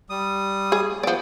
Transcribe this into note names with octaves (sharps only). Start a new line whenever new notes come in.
G3 D#6
G#4
F3 B3 D5